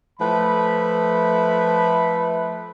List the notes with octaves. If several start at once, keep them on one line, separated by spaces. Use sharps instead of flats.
F3 A3 B4 E5 B5